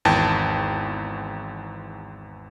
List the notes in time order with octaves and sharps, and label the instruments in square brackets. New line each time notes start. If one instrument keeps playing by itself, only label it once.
[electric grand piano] G#1 E2 G5 A5